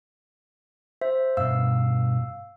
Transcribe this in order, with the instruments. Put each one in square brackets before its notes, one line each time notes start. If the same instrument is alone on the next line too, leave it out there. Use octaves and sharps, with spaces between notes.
[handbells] C5 E5
[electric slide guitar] G2 B2 [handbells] F5 E6